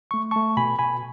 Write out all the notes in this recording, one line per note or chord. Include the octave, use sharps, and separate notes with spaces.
A3 C#6
A3 A5 C#6
B2 G#5 B5
B2 G#5 B5